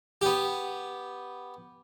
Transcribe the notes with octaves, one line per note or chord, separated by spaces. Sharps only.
B3 G4